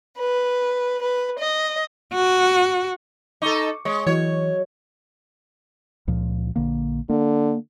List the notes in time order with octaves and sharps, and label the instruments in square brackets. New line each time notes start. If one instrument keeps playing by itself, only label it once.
[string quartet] B4
B4
D#5
[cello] F#4
[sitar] D#4 A4 [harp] C#6 D6
[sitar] G#3 [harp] C#5
[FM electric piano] E3 [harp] F#3 [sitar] C#5
[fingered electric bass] C#2 A#2 F3
A#1 D3 A#3
[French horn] D3 [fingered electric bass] A#3